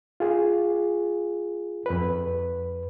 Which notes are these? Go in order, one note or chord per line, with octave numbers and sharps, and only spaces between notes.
F4 G#4
F2 B4